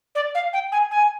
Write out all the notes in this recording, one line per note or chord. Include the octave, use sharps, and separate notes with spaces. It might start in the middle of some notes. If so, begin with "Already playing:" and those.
D5
F5
G5
G#5
G#5